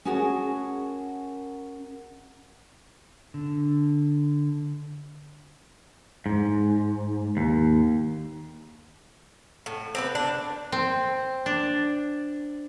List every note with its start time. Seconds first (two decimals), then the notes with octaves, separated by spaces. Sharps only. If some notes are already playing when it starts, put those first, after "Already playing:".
0.05 C#4 F#4 G#4 A#4 F#5 A5
3.34 D3
6.26 G#2
7.37 D#2
9.66 A2
9.95 C4 G4 B4
10.15 D4
10.72 C4
11.46 D4